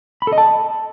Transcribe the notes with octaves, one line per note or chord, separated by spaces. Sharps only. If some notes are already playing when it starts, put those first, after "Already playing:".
B5
A4
D#5
A5